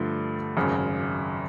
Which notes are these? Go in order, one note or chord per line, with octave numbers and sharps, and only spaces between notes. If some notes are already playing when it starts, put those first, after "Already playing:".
Already playing: G2 D3 F3 A3
G#1 F#2 C#3